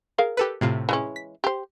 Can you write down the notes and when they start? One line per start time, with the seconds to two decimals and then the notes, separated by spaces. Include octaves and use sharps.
0.18 G#4 A#4 F5
0.37 G4 A4 B4
0.61 A2 C3 F4
0.89 E3 G#3 C#4
1.16 B6
1.44 G4 C5